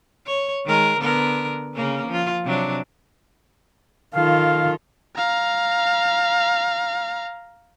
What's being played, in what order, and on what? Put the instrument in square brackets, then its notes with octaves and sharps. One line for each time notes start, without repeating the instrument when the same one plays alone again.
[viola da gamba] C#5
D#3 G#3 A#4
D3 B3 A#4
C#3 A#3 C#4
F3 F4
C3 F#3 D4
[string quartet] D#3 F4 A4 [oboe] F5
[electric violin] F5 A#5